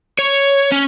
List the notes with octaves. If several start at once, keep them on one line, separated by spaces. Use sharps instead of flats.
C#5
C#4